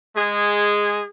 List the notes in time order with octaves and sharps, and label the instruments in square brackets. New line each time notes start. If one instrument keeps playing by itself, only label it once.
[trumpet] G#3 [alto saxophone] G#4